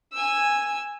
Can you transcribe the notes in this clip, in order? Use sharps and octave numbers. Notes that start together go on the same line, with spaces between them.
G#5 E6